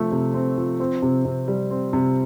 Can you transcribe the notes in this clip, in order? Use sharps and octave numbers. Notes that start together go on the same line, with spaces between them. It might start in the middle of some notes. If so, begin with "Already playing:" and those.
Already playing: C3 F3 A3 C4
C3
C4
F3
C4
C3
C3
G3
C4
C3